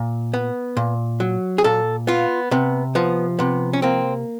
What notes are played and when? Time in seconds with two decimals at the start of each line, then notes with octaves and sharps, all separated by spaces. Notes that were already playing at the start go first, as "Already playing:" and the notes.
Already playing: A#2
0.34 B3
0.77 A#2
1.20 F#3
1.58 G#4
1.64 A#2 A4
2.07 B3 F4
2.51 C3 B3
2.95 F3 B3
3.39 C3 B3
3.73 C#4
3.82 A#3 C4